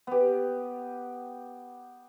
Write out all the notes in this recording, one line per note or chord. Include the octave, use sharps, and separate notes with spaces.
B3 G4